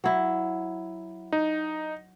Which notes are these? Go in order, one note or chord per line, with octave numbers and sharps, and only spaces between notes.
F#3 E4
D#4